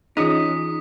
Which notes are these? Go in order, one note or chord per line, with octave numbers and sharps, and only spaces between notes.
E3 C#4 D#4 F4 G#4 D#6 B6